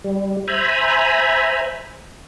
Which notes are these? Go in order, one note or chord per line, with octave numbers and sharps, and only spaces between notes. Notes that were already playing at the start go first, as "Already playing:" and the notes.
G3
C5 E5 G#5 A#5 B5